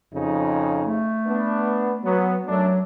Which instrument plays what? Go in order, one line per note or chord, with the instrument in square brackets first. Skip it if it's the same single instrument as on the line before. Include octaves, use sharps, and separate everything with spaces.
[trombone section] F2 C#3 D#4
[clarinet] A3
[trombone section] B3 D4
F#3 B3
[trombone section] F#2 A3 D4 [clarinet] F#3